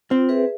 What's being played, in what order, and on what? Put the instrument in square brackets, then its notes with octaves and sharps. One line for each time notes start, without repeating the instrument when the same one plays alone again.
[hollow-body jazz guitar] C4 [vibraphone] F4
[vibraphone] G#4 B4 E5